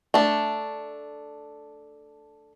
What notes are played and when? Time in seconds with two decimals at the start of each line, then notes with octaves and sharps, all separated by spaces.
0.14 A3 D4